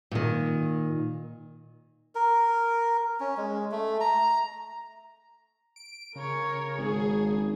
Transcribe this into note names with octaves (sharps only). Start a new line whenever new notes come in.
A#2 D#3
A#4
C#4
G#3
A3
A#5
D7
C#3 A#4 C#5
G#1 G#4